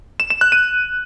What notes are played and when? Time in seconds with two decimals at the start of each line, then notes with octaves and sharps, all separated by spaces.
0.20 E7
0.30 E7
0.41 F#6
0.52 D#7